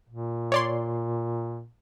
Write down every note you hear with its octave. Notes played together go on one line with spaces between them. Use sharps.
A#2
C#5 D5 C6